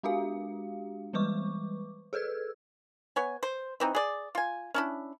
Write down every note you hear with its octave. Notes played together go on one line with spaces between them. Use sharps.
G#3 D4 F#4 G4 F5
E3 G3 G#3 B4 C#6 D6
G#4 A4 B4 E6 G#6
B3 C#5 G#5
C5
E3 C4 D#4
G#4 D5
F4 G#5
C#4 D4 E4